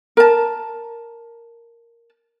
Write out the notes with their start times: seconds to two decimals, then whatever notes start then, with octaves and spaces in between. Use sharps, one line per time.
0.17 A#4 A5